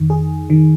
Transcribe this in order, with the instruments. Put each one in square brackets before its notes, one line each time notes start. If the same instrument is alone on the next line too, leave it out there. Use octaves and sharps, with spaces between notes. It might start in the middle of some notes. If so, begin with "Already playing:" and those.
Already playing: [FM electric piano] F2 D#3
G#4
D#3